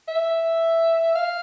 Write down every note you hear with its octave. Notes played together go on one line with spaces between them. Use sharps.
E5
F5